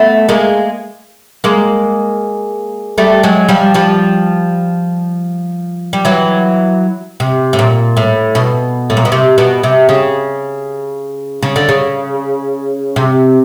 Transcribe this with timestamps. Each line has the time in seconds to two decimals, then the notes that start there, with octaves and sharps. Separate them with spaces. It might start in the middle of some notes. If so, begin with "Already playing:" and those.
Already playing: A3 B3
0.29 G#3 A#3
1.44 G#3 A#3
2.98 G3 A3
3.23 F#3 G#3
3.49 F3 G3
3.74 F3 G3
5.93 G3
6.05 E3 F#3
7.20 C3
7.53 A2
7.59 A#2
7.97 A2
8.35 B2
8.90 A2
8.97 A#2
9.05 B2
9.12 C3
9.38 B2
9.63 C3
9.89 C#3
11.42 C#3
11.56 D3
11.69 C#3
12.96 C3